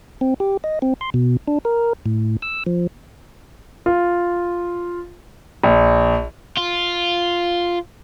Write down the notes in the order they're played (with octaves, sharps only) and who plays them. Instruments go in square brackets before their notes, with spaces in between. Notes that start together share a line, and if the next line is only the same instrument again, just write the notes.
[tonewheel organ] C4
G4
D#5
C4
C6
B2
D4
A#4
A2
E6
F3
[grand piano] F4
A#1
[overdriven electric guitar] F4